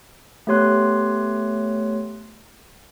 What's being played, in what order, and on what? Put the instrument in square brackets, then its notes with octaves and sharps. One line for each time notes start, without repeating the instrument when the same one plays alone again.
[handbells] A3 B3 G4 C#5 C6 F#6